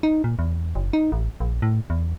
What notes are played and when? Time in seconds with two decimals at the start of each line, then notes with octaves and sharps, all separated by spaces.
0.03 D#4
0.24 A#2
0.39 E2
0.75 F#1
0.93 D#4
1.12 A1
1.40 A#1
1.62 A2
1.90 E2